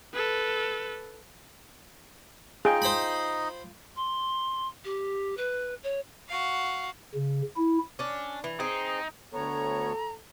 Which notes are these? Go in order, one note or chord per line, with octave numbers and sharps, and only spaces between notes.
A4 B4
D#4 F4 G#4 D#5 G5
C5 B5
C6
G4
B4
C#5
F#4 F5
C#3
E4
C#4 D4
E3
C4 D#4 G#4
D2 B3 A4 C#5 A#5